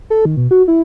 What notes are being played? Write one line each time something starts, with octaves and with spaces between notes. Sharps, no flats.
A4
D#3
B2
F#4
E4